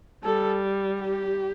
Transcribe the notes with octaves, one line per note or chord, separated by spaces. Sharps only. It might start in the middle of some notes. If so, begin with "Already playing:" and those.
G3 A4
G4